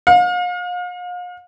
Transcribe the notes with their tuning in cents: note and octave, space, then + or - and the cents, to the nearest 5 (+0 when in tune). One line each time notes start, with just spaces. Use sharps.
F5 +40